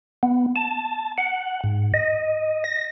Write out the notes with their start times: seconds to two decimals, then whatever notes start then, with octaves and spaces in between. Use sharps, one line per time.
0.23 B3
0.56 A5
1.18 F#5
1.64 G#2
1.94 D#5
2.64 A#6